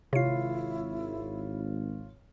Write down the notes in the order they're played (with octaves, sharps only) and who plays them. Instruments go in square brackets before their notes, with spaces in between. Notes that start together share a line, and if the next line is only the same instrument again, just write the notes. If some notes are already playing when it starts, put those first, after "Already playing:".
[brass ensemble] G#1 [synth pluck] C3 C7 [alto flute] E4 [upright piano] F4 C#5